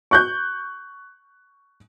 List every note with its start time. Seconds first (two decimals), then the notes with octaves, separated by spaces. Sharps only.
0.11 C#6 F#6 G6